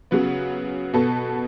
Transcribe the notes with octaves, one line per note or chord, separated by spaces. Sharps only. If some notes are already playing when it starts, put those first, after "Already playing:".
C#3 F#3 B3
B2 B3 A4